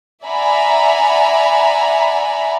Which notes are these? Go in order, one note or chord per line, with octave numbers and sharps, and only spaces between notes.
D5 E5 F#5 G#5 A#5 B5